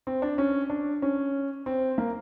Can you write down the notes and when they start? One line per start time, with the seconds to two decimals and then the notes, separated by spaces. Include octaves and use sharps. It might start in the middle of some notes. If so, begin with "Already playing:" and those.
0.07 C4
0.22 D4
0.38 C#4
0.70 D4
1.02 C#4
1.66 C4
1.98 A#3